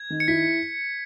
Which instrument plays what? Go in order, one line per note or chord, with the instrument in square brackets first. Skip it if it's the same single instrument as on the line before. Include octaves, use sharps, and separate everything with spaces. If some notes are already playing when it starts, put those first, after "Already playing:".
Already playing: [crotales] G#6
[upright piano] D#3
[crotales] C#7
[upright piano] E4 [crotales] B6